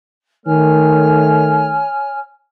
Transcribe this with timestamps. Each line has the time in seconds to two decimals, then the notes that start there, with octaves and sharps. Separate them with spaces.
0.45 D#3 A3 C#5 G#5 F6